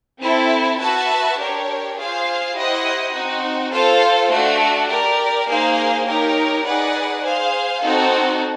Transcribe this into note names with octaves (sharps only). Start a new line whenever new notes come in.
C4 E4 A4
F#4 B4 E5 A5
D4 G4 A#4 C#5
F4 G#4 C5 F5
E4 G4 C5 D#5 F#5
C4 D#4 F#4
F4 A4 C5 F5
A3 D4 F#4
G4 A#4 D5
A#3 D#4 G#4 C5 F5
D#4 G4 A#4 C#5
D#4 G#4 B4 D5 F#5
G#4 C5 F5
C4 D#4 F#4 A4